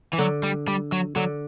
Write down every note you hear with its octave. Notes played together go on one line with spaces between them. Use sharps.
E3
D3 F#3
G3
G3
F#3
D3 F#3